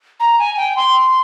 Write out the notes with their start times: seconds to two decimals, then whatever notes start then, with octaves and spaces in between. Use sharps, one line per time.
0.20 A#5
0.39 G#5
0.57 G5
0.77 C6